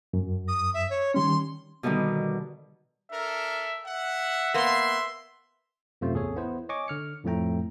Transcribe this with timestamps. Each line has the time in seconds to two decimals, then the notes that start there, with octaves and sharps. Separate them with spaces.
0.13 F#2
0.48 D#6
0.74 E5
0.90 C#5
1.14 D#3 G3 C#4 C6
1.83 B2 D3 D#3 G3
3.11 D4 A4 A#4 E5
3.85 E5 F#5
4.54 A#3 B3 C6
6.01 F#2 C3 A3 F4 C5
6.13 A1 E2 G#4 A4 C#5
6.36 B3 E4 C5
6.69 C#5 D#5 G#5 C#6 D6
6.88 D3 F6 C#7
7.24 F2 A2 F3 A3 G5 A#5